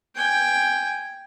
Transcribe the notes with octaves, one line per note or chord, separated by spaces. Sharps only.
G5 G#5